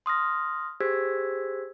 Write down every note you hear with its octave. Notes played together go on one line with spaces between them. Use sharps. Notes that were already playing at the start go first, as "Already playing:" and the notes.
C6 D#6 F6 A#6
G4 G#4 C5 E6 G#6 B6